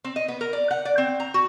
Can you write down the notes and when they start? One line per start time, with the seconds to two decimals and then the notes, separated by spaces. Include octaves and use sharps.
0.04 C4
0.16 D#5
0.28 B3
0.41 A#4
0.53 D5
0.71 F#5
0.85 D5
0.98 C4
1.20 A#5
1.34 F#4